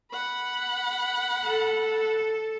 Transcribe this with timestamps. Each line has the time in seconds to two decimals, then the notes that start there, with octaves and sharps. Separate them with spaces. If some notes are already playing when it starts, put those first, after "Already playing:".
0.12 F#5 B5
1.44 A4